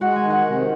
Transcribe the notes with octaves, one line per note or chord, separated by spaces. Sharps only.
G#3 F#4 F#5
G#4 G#5
D#3
F#4 F#5
C3